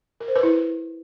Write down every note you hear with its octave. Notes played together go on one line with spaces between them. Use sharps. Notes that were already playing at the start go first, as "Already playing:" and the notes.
A#4
C5
B4
E4